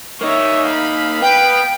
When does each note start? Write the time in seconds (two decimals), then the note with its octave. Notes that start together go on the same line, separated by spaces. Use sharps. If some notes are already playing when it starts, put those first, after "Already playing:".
0.21 A#3 D#4 C#5 E5
0.66 F5 B5
1.22 B3 G5